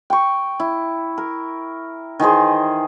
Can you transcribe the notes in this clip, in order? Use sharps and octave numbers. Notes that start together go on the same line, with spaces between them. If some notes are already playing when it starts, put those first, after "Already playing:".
G5 C#6
E4
A#4
D#3 E3 G#4 C5